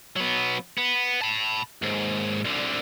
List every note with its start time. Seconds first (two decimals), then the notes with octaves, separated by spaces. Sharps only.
0.16 F#3 B3
0.77 B3
1.22 A5 B5
1.82 D#2 G#2
2.45 C2 D3